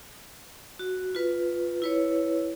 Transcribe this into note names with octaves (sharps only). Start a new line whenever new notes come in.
F#4
F4 B4
E4 B4 C#5